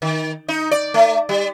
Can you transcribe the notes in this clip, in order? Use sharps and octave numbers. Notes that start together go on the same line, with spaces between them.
D#3
D#4
D5
A3
G3